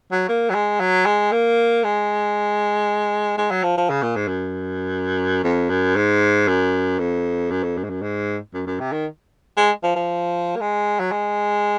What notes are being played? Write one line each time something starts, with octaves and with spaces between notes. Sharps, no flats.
F#3
A#3
F#3
G#3
F#3
G#3
A#3
G#3
G#3
F#3
F3
F3
C#3
A#2
G#2
F#2
F2
F#2
G#2
F#2
F2
F#2
F2
F#2
G#2
F#2
G#2
F#2
F#2
C3
D#3
G#3
F3
F3
A#3
G#3
F#3
G#3